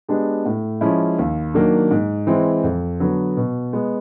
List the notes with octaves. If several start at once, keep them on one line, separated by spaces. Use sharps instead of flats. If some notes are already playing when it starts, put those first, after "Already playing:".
G#3 B3 D4 G4
A2
F3 G#3 C#4 E4
D#2
D#3 F#3 A#3 D4
G#2
E3 G#3 C4
F2
D3 F#3 B3
B2
G#3 B3